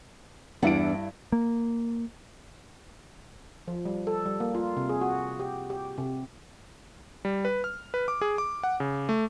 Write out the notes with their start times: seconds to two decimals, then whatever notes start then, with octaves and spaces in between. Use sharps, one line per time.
0.62 E2 G2 D4 E4 F#5 D7
1.32 A#3
3.68 F3
3.85 G3
4.07 A4
4.26 G3
4.40 A#3
4.55 F4
4.77 C3
4.89 G#4
5.01 F#4
5.40 G4
5.70 G4
5.98 C3
7.25 G3
7.45 B4
7.64 F6
7.94 B4
8.08 D6
8.21 G#4
8.38 D6
8.63 F#5
8.80 C#3
9.09 A3